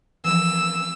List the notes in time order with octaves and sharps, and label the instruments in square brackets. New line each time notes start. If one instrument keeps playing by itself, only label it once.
[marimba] E3 F3 [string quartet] E6